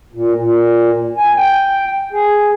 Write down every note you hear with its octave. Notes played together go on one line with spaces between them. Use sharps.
A#2
A#2
G#5
G5
G#4